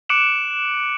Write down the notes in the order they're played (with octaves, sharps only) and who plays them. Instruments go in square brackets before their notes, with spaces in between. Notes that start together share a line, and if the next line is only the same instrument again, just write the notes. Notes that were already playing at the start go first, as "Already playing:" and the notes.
[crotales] D6 F#6 C#7 D7 E7 F#7